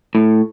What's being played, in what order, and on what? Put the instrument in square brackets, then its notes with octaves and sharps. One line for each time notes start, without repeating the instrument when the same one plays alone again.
[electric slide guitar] A2